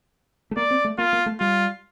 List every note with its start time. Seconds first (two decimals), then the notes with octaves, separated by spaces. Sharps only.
0.51 A3
0.57 A#3 D5
0.71 C4
0.85 A3
0.98 A#3 F4
1.13 A#3
1.26 A3
1.40 G3 F4